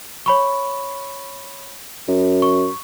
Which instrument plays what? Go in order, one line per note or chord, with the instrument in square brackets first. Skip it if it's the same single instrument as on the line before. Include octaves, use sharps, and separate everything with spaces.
[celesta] C#5 B5 C#6
[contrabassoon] F#2
[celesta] C#6